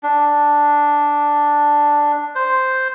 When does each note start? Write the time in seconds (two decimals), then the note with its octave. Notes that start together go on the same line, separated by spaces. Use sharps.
0.03 D4
2.35 C5